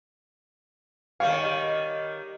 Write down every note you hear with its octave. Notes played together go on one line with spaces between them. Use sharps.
D#3 G3 C#5 F5